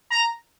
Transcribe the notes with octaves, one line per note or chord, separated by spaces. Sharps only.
A#5